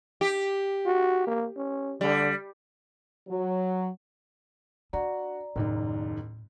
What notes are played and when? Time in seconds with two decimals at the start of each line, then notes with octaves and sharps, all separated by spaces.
0.21 G4
0.86 F#4
1.27 A#3
1.57 C#4
2.01 D3 G3
3.28 F#3
4.93 D4 F#4 D5 A#5
5.56 F#1 D#2 A2 D#3